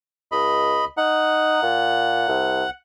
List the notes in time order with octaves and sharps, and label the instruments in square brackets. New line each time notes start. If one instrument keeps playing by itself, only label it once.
[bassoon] C#2 [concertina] D#5 B5
[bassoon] D#4 [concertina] F#5
[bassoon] A#2
C2